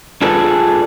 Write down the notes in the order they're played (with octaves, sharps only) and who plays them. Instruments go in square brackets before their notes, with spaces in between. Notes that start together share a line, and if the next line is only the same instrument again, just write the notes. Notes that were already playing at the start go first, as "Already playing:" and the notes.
[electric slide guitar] D4 F4 G#4 A4 B4